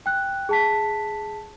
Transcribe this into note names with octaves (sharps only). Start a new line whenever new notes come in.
G5 F#6
G#4 A5 B6